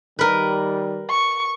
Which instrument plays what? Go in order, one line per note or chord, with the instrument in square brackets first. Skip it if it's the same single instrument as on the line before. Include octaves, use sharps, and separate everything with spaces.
[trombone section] D#3 G3 [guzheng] A#4 B4
[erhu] C#6